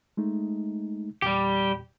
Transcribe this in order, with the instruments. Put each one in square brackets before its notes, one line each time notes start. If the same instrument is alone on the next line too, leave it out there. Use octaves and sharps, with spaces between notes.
[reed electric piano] G#3 A3 D#4
[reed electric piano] E2 A#2 [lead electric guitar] G3 G4